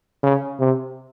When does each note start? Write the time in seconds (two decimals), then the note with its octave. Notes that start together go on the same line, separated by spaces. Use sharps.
0.23 C#3
0.60 C3